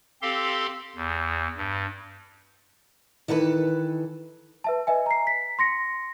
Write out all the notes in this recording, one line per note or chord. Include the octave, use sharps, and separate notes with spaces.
C4 G4 A4 F5 C6
E2
G2
D#3 E3 A4 B4
B4 E5 A5
B4 D#5 E5 G#5
A#5 C7
B6
C6 A#6 C#7